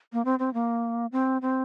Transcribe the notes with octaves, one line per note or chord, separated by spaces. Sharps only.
A#3
C4
C4
A#3
C4
C4